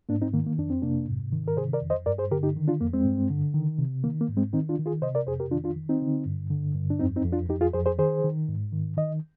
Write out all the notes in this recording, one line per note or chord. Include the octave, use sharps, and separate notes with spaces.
G#2 A#3 D4
C4 D#4
D#3 A#3
A#3
F2 D4
C4
C3 A#3 D4
G#2
D#3
A#4
C3 G#4 C5
A#4 D5
F2
C5 D#5
G2 A#4 D5
G#4 C5
D3 G4 A#4
D#4 G4
D#3
D4 F4
F2 A#3
G#3 C4
G2
D3
D#3
C3
D#3 A#3
A#3
G#2
G#3 C4
D#3 C4 D#4
D4 F4
D#3
F4 G#4
C3 C5 D#5
A#4 D5
F2 G#4 C5
G4 A#4
D#3 D4 F4
D4 F4
D#3
C4 D#4
D3
G2
D3
G2
D4
F2 C4 D#4
C4 D#4
F2
D4 F4
F2 D#4 G4
F4 G#4
F2 G#4 C5
G#4 C5
D#3 G#4 C5
D#3
G#2
D#3
D#3 D#5